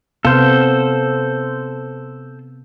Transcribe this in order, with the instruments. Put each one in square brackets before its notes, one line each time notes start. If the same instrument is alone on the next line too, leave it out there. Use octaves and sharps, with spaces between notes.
[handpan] C3 B3 F5 [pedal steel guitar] A4 C5